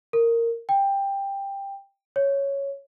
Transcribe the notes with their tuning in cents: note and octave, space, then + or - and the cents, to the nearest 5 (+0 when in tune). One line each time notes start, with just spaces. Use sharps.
A#4 -15
G5 +15
C#5 +0